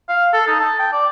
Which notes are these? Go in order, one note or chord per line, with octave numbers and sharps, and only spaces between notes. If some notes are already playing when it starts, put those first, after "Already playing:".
F5
A4
D#4
A5
G5
D5